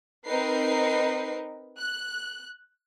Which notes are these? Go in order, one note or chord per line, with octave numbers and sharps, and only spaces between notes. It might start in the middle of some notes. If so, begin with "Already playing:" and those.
C4 D#4 A#4 B4 C7
F#6